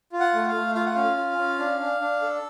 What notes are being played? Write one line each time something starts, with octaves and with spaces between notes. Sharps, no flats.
F4
F#5
A3
F5
A3
F4 F5
F#5
C#4 F5
F4
C#4
D4
D4
D4
A4